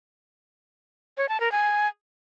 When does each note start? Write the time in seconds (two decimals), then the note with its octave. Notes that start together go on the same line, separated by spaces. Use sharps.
1.17 C#5
1.29 A5
1.40 A#4
1.52 G#5